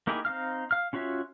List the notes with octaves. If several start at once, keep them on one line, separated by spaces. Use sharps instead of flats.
A#3 D#4 E4 G4 G#4
C4 D#4 F5 F6
F5 F6
C#4 F4 F#4 C#5 E5